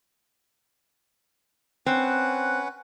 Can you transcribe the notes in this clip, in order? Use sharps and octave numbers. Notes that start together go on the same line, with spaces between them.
C4 C#4 B4 F#5